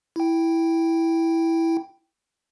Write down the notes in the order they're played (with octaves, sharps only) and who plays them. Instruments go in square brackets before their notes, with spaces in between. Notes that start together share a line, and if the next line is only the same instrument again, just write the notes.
[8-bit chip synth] E4 G5